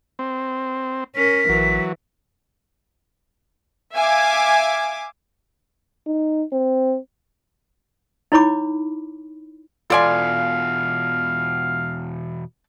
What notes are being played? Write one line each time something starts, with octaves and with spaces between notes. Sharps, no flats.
C4
C#4 A#4 B6
A1 E3 F#3
E5 F5 G#5 D6 G#6
D#4
C4
D#4 E4 C#5 B5 D6
E2 B2 F4 A4 D5 F5 G#5